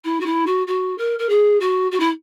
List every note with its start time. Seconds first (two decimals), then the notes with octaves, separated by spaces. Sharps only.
0.04 E4
0.20 F#4
0.25 E4
0.46 F#4
0.67 F#4
0.98 A#4
1.19 A#4
1.29 G#4
1.60 F#4
1.91 F#4
2.00 E4